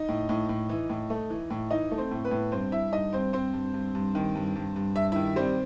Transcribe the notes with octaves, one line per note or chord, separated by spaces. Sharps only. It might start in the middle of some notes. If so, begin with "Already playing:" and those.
Already playing: D#4 D#5
A2
A2
A2
E3
A2
A3
E3
A2
E3 D#4 D#5
A3
C4 C5
A2
B3 B4
A2
G2 C4 C5
G2 E4 E5
G2 D#4 D#5
G2 C4 C5
G2 C4 C5
G2
G2
G2
D#3
G2
G2
G2
G2 E5
D#3 E4 E5
G3 C4 C5